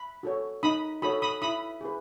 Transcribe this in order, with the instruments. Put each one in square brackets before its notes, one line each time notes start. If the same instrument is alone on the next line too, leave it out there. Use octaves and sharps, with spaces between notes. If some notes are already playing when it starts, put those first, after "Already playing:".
Already playing: [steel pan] B5
F#4 A4 C#5
D#4 B5 D#6
F#4 A4 C#5 B5 D#6
B5 D#6
E4 B5 D#6
G#4 B4